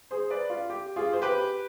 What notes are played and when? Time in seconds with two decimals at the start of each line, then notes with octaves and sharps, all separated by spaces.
0.11 G#4 C5
0.30 B4 D5
0.50 F4
0.70 G4
0.96 F4 G#4
1.13 C5
1.22 G4 B4